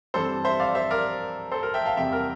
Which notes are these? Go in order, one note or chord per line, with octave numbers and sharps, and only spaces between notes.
G2 E3 G3 C4 A4 C5
C5 E5
D5 F5
C5 E5
A#4 D5
A4 C5
A#4
E5 G5
F5 A5
E2 C3 G3 C4 E5 G5
A#4